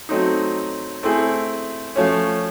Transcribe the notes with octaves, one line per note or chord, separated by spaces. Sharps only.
F#3 A3 C4 D#4
A3 C4 E4 G#4
F3 A3 C#4